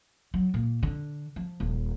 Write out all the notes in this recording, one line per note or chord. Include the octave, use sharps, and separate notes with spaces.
F#3
A#2
D3
F3
D#1